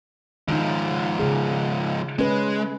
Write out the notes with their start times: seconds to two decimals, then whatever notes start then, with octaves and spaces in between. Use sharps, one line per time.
0.48 G#2 D#3 F3 D#4
1.19 C#3 G#4
2.19 G#3 C#4 B4